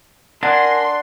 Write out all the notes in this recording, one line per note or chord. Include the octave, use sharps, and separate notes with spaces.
D4 A#4 F#5 G#5 C6